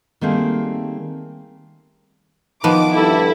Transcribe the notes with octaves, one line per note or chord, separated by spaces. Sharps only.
D#3 G3 A3 A#3 C4 G#4
D#3 F3 B3 D#4 D6
G2 E4 A4